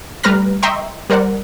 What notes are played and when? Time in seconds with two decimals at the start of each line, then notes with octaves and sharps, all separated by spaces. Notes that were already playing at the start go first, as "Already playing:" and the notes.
0.23 G3 A3 B4 A#5 F6 A#6
0.63 D#5 E5 G5 A#5 C6 C#6
1.10 G3 A#4 C5 D5 F#5